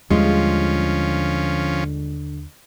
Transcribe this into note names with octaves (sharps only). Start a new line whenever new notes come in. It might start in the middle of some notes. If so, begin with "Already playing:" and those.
D#2 D3 F3 G3 G#3 C#4 F4